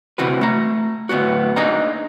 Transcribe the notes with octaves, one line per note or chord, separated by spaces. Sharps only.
D2 C3 E3 F#4 B4
A3 A#5
D2 A2 B3 F#4
A#3 D4 D#4 G#4 D#5 A#5